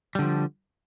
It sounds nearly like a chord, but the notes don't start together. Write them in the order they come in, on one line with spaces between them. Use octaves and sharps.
G3 D3 F3